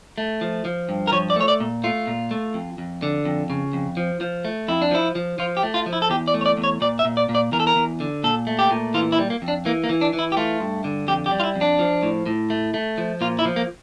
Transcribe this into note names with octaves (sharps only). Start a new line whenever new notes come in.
A3
F3
F3
G2
A#4
F3 C#5
D5
A3 C#5
D5
A#2
A3 F4
A#2
A3
F2
F2
D3
F2
C#3
F2
F3
F3
A3
F2 E4
D4
F3 E4
F3
F3 F4
G4
A3
F4
F3
E4
A4
E2 G4
D5
A3
C#5
D5
E2
C#5
A#2 D5
E5
A#2
D5
A#2
D5
E2 A#4
A4
A#4
E2
D3
A#2 A4
A3
G4
A#2
E3 F4
E4
G3
A#3
F2
D4
E3 A#3
A#3
E3
D4
E3
E4
G4
A3 F4
G2
D3
F2 G4
G4
G3
F4
E4
F2
D4
F3
A2
A2
A3
A3
F3
A#2 F4
E4
F3
A#3